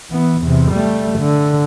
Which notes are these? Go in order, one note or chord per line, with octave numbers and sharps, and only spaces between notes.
E3 B3
E2 C3
G3 A3
D3